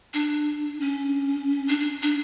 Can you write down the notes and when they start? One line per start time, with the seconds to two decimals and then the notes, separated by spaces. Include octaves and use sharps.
0.14 D4
0.81 C#4
1.68 D4
1.80 D4
2.02 D4